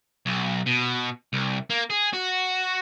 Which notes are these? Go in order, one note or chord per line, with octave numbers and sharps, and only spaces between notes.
B1
B2
C2
A#3
G#4
F#4